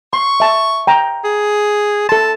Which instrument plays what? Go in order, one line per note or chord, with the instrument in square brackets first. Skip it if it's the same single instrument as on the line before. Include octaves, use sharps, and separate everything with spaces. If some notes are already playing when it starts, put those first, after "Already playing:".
[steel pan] C6 [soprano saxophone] C#6
[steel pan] E5 A5
G5 A#5
[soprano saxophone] G#4
[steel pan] A4 C6 [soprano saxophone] A5